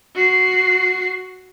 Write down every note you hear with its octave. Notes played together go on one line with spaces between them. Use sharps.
F#4 C7